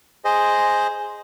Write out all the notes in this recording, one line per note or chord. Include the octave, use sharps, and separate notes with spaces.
G#4 C5 D#5